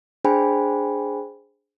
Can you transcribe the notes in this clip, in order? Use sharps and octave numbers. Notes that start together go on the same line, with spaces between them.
D4 G#4 C5 G5 G#5 B5